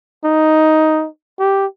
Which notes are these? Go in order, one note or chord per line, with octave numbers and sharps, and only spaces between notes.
D#4
G4